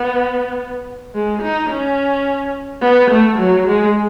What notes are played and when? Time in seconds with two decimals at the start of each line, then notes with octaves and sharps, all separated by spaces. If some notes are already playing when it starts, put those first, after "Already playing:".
Already playing: B3
1.15 G#3
1.42 D#4
1.70 C#4
2.82 B3
3.11 A3
3.39 F#3
3.67 G#3